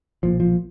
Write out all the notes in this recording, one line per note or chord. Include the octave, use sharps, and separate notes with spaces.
B1 A#2 F3
F3